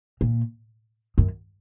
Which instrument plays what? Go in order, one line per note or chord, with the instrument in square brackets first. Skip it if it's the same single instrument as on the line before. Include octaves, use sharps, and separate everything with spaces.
[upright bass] A#2
F#2